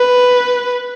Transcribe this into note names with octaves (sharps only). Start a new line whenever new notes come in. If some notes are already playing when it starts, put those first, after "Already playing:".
Already playing: B4